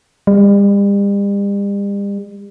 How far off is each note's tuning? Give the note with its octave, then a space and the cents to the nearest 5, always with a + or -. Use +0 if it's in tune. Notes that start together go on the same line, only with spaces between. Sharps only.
G3 +40